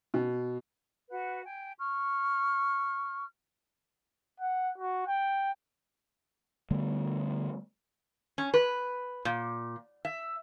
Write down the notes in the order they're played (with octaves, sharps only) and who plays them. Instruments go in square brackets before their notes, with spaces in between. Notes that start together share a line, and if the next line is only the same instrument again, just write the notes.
[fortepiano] B2
[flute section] F#4 B4 F#5
G5 G#5
C#6 F6
[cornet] F#5
F#4
G5
[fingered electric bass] D3 G3 A3 B3
[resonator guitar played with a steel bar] C#4
B4
A#2
E5